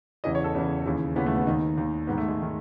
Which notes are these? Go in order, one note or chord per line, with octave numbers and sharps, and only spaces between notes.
E2 C#3 E3 D#5
C#5
A4
E2 C#3 E3
D#2 C#3 E3
D#2 C#3 E3 B3
A3
B3
D#2 D#3 D#4
D#2 D#3
G#2 D#3 B3
A3
G#3
D#3